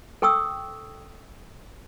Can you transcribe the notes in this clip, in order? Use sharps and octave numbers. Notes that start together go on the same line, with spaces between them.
A4 G5 C#6 D#6 E6